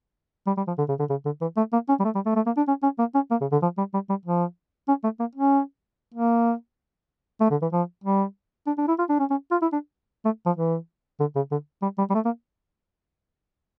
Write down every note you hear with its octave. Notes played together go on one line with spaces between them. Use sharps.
G3
G3
F3
D3
C#3
D3
C#3
D3
E3
A3
A#3
C#4
G3
A3
G3
A3
A3
A#3
D4
C#4
C#4
A#3
C#4
A#3
C#3
D3
F3
G3
G3
G3
F3
C#4
A3
A#3
C#4
A#3
A3
D3
E3
F3
G3
D4
D4
E4
F4
D4
C#4
C#4
F4
E4
D4
A3
F3
E3
D3
C#3
D3
G3
G3
G3
A3
A#3